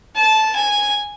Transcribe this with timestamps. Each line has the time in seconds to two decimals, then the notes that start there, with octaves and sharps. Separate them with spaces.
0.16 A5
0.55 G#5